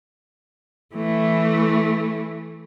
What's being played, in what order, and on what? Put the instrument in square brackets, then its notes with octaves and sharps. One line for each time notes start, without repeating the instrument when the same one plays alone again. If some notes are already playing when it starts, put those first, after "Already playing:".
[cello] E3 A3